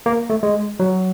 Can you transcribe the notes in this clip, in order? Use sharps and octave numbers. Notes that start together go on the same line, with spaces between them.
A#3
A3
G#3
F#3